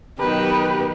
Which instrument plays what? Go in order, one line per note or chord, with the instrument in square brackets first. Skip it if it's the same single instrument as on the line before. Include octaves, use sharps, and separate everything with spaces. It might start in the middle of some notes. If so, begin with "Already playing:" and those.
[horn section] B2 G4 [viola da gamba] D#3 F#3 B3 [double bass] D#4 [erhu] B4